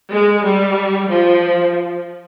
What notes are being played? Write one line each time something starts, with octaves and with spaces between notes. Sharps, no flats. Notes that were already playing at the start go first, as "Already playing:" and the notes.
G#3
G3
F3